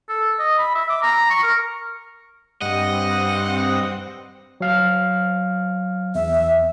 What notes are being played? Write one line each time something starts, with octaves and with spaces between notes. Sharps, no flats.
A4
D#5
B5
E5
D6
A#5
C#6
A#4
G2 C4 D#5 F#5
F#3 F5 F6
E2 E5